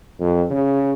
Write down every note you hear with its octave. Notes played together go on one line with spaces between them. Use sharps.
F2
C#3